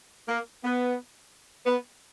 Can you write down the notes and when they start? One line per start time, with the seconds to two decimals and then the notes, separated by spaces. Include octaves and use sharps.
0.28 A#3
0.63 B3
1.66 B3